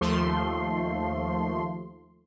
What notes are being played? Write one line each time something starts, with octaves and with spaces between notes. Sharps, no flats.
D#2 F3 A3 C6